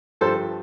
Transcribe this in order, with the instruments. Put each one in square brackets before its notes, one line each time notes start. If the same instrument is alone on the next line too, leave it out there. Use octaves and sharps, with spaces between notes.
[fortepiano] G2 F3 A4 C5